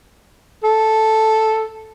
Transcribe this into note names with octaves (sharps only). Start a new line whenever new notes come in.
A4